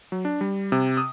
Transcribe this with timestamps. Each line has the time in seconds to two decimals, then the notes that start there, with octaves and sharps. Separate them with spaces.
0.12 F#3
0.25 D4
0.41 G3
0.72 C3
0.97 D#6